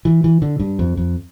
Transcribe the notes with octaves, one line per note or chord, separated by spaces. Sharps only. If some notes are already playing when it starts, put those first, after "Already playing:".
E3
E3
D3
G2
F2
F2